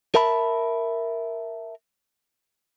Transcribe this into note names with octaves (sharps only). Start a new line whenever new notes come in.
A#4 E5 A5 B5